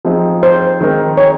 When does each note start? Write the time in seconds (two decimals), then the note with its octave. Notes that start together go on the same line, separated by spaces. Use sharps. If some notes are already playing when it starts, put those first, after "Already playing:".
0.05 F3 C4 D#4 G#4
0.43 C5
0.81 D#3 G#3 C4 D#4 A#4
1.18 C#5